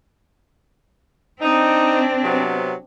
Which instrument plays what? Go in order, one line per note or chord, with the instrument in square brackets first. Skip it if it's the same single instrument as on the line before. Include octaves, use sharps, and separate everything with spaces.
[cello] C4 D4 [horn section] D#4
[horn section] C3 F#3 B3